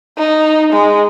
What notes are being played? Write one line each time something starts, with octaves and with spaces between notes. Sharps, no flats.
D#4
G#3